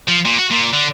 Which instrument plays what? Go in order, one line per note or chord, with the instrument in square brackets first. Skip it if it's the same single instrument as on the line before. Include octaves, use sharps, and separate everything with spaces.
[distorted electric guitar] F3
A#2
F#4
A#2
D3